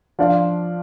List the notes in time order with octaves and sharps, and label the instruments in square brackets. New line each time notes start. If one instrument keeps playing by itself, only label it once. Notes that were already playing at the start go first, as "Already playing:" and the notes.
[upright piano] F3 D4 F4 D5 F5